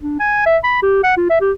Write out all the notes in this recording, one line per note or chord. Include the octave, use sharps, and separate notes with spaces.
D4
G#5
E5
B5
G4
F#5
F4
E5
G4